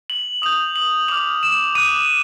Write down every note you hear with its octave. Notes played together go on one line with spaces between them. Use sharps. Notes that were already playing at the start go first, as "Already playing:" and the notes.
F#7
D#6 G6 F7
F#7
D6 F6 F7
E7
D6 F#6 D#7